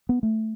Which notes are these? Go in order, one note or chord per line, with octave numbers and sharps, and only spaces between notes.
B3
A3